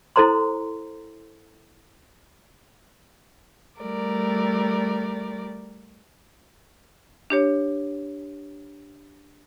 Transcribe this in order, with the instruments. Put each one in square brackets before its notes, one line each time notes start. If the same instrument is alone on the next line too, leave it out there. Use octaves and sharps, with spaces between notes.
[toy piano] E4 A4 C5 A#5 C6
[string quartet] G3 A3 A#4 D5
[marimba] D4 G4 C#5